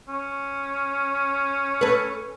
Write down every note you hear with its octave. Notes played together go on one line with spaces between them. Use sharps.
C#4
A4 B4